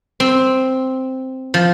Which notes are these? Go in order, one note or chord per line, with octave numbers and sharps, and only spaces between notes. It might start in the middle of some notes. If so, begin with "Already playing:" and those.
C4
F3